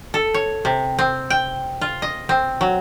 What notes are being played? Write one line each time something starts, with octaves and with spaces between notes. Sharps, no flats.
A4
C#5
C3
C4
G5
F4
D#5
C4
F#3